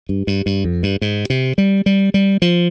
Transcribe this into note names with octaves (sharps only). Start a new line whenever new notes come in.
G2
G2
G2
F2
G2
G#2
C3
G3
G3
G3
F3